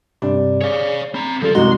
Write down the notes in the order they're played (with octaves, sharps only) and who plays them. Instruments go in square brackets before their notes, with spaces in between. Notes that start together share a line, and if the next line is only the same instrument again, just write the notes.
[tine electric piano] G2 C3 G3 [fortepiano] D4
[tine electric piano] G#4 D5 [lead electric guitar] C#5 F5
[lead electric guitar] C4 A#5 [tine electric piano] B5
[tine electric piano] C#3 G3 [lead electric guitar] F3 F4 [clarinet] A4
[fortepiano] C2 F#4 [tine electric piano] F#2 D#4 [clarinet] G#3 [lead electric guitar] C6